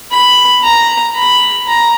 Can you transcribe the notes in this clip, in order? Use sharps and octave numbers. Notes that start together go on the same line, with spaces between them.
B5
A#5
B5
A#5